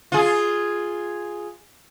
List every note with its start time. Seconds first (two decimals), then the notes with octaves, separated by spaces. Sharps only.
0.12 F4 G#4